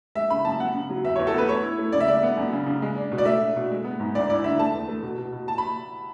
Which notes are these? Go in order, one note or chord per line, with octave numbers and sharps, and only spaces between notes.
G#3 E5
C#3 B5
F#2 A5
B3 F#5
C#3
F#3
E2 E5
C#5
E2
A4
B3 B4
A3 C#5
E4
A3
C#3 D5
E5
G#3 D5
B3
F#2
C#3
C#3
G#3
D4
B2
D5
A3 E5
D4
B2
G#3
B3
G#2
D2 D5
E4 D5
D3 E5
A3 A5
E2
A3
B2
B2
B2
B2 A5
B5